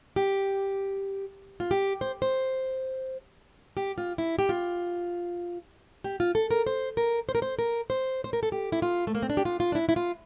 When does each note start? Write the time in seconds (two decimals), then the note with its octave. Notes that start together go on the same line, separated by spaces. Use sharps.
0.16 G4
1.60 F4
1.71 G4
2.01 C5
2.22 C5
3.77 G4
3.98 F4
4.18 E4
4.39 G4
4.49 F4
6.04 G4
6.20 F4
6.35 A4
6.51 A#4
6.67 C5
6.97 A#4
7.29 C5
7.35 A#4
7.42 C5
7.59 A#4
7.90 C5
8.24 C5
8.33 A#4
8.43 A4
8.52 G4
8.72 E4
8.82 F4
9.07 A3
9.15 A#3
9.22 C4
9.30 D4
9.37 G4
9.45 F4
9.60 F4
9.72 D4
9.75 E4
9.89 E4
9.96 F4